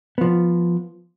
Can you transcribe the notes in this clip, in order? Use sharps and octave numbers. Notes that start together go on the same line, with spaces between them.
F3 B3